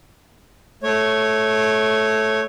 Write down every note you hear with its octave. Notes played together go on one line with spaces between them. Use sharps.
A3 C#5